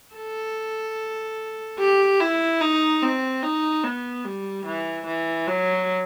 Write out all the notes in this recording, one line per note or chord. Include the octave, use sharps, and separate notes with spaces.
A4
G4
E4
D#4
C4
D#4
B3
G3
E3
E3
F#3